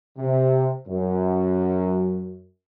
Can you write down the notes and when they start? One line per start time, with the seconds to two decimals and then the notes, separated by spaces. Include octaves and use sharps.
0.18 C3
0.88 F#2